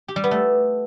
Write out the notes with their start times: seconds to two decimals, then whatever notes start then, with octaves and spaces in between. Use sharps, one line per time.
0.08 G4
0.16 G3
0.24 B3
0.31 A3